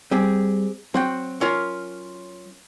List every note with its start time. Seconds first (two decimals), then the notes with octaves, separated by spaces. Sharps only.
0.11 G3 C4 G4 G#4
0.94 F#3 C4 F#4 G5
1.41 C#4 F4 A#4